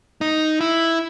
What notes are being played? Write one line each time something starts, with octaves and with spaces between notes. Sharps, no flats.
D#4
E4